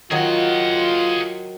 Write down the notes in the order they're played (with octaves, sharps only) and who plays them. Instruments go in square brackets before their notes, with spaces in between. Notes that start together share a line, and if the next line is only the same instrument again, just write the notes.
[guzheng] D#3 F#3 [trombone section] F4 [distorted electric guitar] G#4 F#5